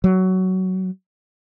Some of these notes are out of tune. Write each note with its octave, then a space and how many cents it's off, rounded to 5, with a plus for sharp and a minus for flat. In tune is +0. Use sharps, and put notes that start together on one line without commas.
F#3 +15